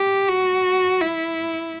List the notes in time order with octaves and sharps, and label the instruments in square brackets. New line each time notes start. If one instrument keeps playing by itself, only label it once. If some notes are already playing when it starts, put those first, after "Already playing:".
Already playing: [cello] G4
F#4
E4